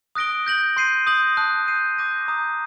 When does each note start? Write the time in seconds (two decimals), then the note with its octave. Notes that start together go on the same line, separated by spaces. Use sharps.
0.15 D#6 F#6 A#6 D7 G7
0.46 G6 A#6 F#7
0.77 C6 G6 C7 D#7
1.07 D#6 G6 A#6 F#7
1.37 A5 D#6 F#6
1.68 G6 C7 D#7
1.98 D6 G6 A#6 D#7
2.28 A#5 D#6 G6